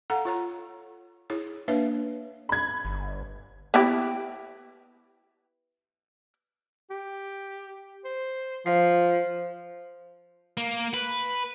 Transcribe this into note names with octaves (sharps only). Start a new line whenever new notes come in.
A4 F5 F#5 A#5
F4 C#5 A#5
E4 G#4 C#5
A#3 D4 B4 C#5 E5 F5
B5 G#6
G1
B3 E4 G4
G4
C5
F3 C5 F5 C7
A#3
B4